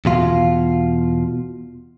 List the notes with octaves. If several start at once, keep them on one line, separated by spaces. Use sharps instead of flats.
E2 B2 F4